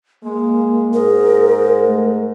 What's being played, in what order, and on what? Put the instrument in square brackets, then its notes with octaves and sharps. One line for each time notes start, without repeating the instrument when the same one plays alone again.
[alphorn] G#3 [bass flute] A#3
[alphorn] G#2 [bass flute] G#4 [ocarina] A#4
[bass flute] A3